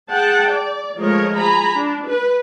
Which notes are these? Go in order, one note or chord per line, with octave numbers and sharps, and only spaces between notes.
G#4 F#5 G5 A5
D5
F3 G#3 A3 A#4 C#5 D#5
G#4 G#5 A#5 B5
D4
B4